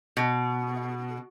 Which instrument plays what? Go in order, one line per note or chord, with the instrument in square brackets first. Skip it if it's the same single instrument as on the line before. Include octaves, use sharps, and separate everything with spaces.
[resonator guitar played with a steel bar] B2